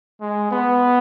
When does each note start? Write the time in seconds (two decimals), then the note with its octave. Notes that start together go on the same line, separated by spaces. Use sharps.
0.21 G#3
0.51 B3